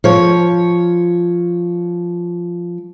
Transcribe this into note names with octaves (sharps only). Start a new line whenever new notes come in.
F3 C#5